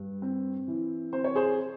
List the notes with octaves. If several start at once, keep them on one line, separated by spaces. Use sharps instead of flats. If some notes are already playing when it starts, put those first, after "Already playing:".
Already playing: G2
C4
E3
C4 C5
C#5
G#4 C5